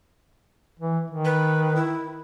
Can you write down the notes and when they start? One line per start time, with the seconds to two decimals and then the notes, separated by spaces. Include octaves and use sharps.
0.80 E3
1.11 D#3
1.25 B4
1.76 E4